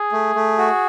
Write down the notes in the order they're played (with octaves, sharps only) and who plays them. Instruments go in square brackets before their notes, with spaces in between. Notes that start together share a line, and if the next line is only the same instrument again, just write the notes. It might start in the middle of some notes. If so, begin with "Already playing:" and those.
Already playing: [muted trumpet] G#4
[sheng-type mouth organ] A3
A3
F#4